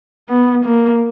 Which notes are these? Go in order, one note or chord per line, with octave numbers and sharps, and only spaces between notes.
B3
A#3